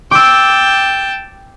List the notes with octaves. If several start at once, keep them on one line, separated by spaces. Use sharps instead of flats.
G5 A5 D6 E6